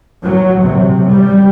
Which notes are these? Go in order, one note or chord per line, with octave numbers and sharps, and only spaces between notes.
F#3
C3
G3